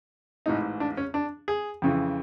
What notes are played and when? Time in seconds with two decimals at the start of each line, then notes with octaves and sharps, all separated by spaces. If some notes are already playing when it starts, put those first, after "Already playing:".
0.46 A1 G#2 E3 D#4
0.80 D4
0.97 C#4
1.14 D4
1.48 G#4
1.82 F2 C#3 E3